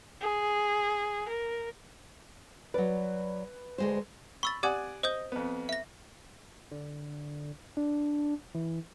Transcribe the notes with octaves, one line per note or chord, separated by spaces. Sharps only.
G#4
A#4
F#3 B4 D5
D2 G#3 C5
B5 C#6 E6 A6
G4 D5 F#5 G#5 D#6 G#6
C5 D#5 D#6 G6
F2 B3
E5 A#6
D3
D4
E3